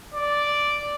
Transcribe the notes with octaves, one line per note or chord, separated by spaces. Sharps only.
D5